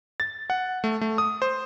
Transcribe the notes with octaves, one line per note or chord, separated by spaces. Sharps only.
A6
F#5
A3
A3
D#6
C5